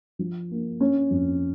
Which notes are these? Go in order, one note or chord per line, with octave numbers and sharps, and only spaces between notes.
F3
A#3
C#4
F2